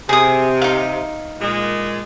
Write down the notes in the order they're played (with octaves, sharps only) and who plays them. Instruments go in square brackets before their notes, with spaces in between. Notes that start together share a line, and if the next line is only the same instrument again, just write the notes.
[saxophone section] C3 [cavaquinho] G#4 D#6
[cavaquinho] D#4 F5
[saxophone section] A#2 G#3